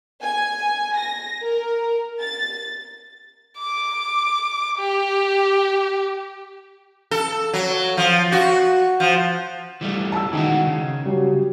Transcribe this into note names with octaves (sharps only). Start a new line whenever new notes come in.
G#5
A#6
A#4
A6
D6
G4
A4
F#3
F3
F#4
F3
E3 G3 A3
A5 E6
D#3 E3 G#3 F#4
C#3
F#3 G3